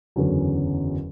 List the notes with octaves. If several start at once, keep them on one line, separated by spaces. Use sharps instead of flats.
F#1 E2 D3 F#3 C#4